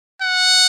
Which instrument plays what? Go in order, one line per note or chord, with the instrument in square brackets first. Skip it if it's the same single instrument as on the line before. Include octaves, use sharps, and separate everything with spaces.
[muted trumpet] F#5